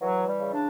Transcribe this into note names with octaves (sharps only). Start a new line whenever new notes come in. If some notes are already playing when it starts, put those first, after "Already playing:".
E3 F#3
G3
C#3
D4